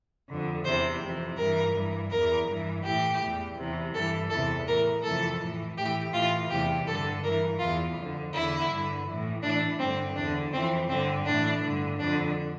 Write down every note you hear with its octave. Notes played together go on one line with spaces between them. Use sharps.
F2 D3
E2 C3 E3 C5
F2 C3 E3
G2 E3 A#4
G2 E3
E2 E3 A#4
G2 E3
A2 E3 G4
E2 E3
E2 C3 E3
G2 E3 A4
E2 C3 E3 A4
A2 E3 A#4
F2 C3 E3 A4
A2 E3
A2 E3 G4
A2 E3 F4
E2 C3 E3 G4
G2 D3 A4
G2 E3 A#4
E2 E3 F4
F2 D3
E2 D3 E4
G2 D3
A2 E3
A2 E3 D4
G2 D3 C4
E2 D3 D4
F2 E3 C4
G2 D3 C4
A2 E3 D4
G2 D3
F2 D3 D4